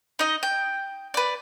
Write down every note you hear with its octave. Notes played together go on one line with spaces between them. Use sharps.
D#4 D#5
G5
B4 D5